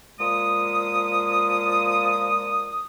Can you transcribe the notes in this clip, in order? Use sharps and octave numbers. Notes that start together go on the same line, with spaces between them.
A#2 F3 G#3 D#6